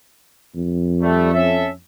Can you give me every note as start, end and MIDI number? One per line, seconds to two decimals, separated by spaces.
0.56 1.79 41
1.02 1.32 55
1.02 1.32 57
1.33 1.69 61
1.33 1.69 69
1.33 1.69 76